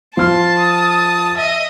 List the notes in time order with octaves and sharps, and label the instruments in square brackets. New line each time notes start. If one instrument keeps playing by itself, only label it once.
[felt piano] F3 F6 [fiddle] A5 [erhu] C6
[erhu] D#6
[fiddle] D#5 [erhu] E5